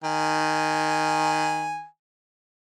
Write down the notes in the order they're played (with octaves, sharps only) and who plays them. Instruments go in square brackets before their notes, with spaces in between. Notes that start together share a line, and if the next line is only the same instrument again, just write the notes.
[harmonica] D#3 G#5